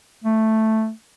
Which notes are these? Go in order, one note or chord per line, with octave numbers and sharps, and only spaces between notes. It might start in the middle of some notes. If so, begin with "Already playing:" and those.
A3